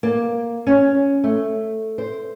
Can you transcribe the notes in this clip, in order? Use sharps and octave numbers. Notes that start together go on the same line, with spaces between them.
A#3
C#4
A3
C5